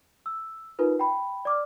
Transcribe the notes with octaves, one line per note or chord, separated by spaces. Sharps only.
E6
D#4 F4 A#4 B4
G5 B5
D5 D6 F6